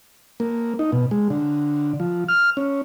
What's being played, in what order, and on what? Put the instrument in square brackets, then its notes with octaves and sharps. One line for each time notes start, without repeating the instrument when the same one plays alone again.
[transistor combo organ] A#3
D#4
B2
G#3
D3
F3
F6
C#4